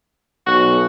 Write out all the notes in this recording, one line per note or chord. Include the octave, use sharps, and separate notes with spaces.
B1 F#4